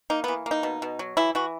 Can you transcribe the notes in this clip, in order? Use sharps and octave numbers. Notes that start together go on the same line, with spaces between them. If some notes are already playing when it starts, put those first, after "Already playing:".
A#3 D#4
B3
E3
A#3 D#4
B2
B2
F#3
E3 E4
E3 F#4